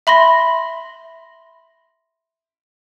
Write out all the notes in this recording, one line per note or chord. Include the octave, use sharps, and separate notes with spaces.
E5 B5 C6 A#6